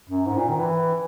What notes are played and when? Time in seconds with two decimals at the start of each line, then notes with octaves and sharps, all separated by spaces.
0.09 F#2
0.26 G#2
0.38 A#2
0.49 D#3
0.59 E3